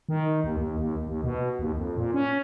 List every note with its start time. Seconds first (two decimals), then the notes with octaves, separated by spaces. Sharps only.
0.09 D#3
0.44 D#2
0.57 D#2
0.79 D#2
1.07 D#2
1.24 B2
1.59 D#2
1.77 F2
1.97 A#2
2.14 C#4